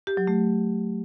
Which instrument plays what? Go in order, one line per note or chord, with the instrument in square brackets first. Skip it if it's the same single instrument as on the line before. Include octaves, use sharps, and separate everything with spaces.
[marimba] G4
F#3
A3